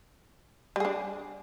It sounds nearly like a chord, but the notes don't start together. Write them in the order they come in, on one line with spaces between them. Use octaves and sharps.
G3 G#4 D4